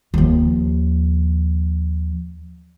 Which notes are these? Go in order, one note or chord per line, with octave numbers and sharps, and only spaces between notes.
D#2 F3